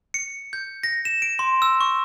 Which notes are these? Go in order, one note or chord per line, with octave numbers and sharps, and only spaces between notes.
C#7
G6
A#6
E7
D7
C6
E6
C#6